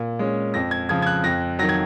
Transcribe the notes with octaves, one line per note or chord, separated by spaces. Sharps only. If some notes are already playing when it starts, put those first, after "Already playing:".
Already playing: A#2
G#3 C#4
F2 A#6
G#6
C#3 F3 G#6
G#6
F#6
F2 A#6
D#3 F#3 A#6
G#6